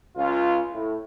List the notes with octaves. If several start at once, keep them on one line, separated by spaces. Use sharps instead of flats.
C#2 C#4 F4
A2